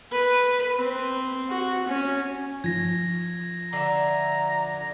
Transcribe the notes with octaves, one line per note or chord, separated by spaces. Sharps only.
B4
C4
F#4
C#4
F3 G#6 A#6
D3 E5 A#5